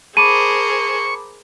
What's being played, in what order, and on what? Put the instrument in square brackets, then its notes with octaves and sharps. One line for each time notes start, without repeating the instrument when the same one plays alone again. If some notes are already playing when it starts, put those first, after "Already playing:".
[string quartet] G#4 A#4 C5 [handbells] A5 B5 D6 [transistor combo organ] C#6 [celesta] D#7